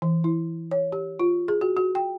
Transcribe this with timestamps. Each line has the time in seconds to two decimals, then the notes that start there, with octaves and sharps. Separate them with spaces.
0.02 E3
0.24 E4
0.71 C#5
0.92 G4
1.20 F4
1.48 G#4
1.61 F#4
1.77 F#4
1.95 G5